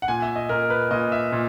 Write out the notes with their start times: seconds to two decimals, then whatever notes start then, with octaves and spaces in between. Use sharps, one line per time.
0.02 F#5
0.08 A#2 G#5
0.22 E5
0.36 D#5
0.49 A#2 A#4
0.70 B4
0.91 A#2 D#5
1.12 E5
1.32 A#2